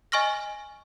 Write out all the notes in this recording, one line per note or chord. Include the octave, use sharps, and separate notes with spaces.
D#5 G#5 C#6 F6 A#6